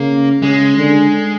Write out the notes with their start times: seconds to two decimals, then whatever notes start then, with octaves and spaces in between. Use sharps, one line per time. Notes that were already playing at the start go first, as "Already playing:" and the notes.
Already playing: C#3 A#3
0.42 C#3 G#3
0.78 D3